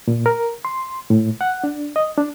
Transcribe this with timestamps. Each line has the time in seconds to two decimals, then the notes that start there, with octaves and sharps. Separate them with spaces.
0.08 A#2
0.26 A#4
0.65 C6
1.10 A2
1.41 F#5
1.64 D4
1.96 D#5
2.18 D4